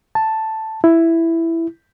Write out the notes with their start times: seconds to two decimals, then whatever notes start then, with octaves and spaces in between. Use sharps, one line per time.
0.15 A5
0.84 E4